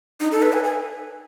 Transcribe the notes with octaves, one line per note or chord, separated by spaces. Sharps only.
D#4
A4
B4
G#5
G#5